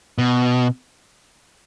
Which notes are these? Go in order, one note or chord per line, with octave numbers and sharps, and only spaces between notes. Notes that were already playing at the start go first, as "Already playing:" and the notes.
B2